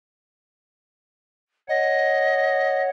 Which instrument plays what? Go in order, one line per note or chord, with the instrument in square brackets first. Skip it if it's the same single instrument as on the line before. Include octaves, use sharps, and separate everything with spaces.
[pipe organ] C#5 F#5 [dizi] D#5